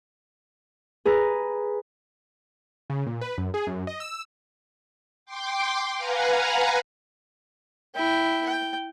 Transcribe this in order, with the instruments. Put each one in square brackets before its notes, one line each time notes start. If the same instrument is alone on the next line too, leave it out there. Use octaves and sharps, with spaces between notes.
[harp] G#4 B4 A#5
[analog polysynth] C#3
A#2
B4
F#2
G#4
F#2
D#5
E6
[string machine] G5 C6 D6
B4 F5 F#5 G#5 A#5
[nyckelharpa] E4 G5
G5